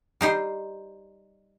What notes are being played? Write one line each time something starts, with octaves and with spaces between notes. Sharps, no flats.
G3 D#4 C5